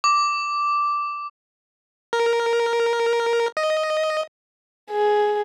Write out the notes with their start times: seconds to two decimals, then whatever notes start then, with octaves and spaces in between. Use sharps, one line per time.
0.04 D6
2.13 A#4
3.57 D#5
4.91 G#4